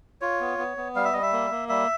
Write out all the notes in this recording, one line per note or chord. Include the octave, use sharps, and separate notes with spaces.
F4 C#5
B3
B3
B3
G3 F5
E5
G3 D#5
E5
A#3
A#3
G3 E5